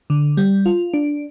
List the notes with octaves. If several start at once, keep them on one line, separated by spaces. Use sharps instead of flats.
D3
G3
F4
D4